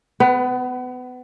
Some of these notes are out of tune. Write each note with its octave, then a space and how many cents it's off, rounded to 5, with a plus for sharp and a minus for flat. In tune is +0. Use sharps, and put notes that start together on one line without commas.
B3 +30 B4 +0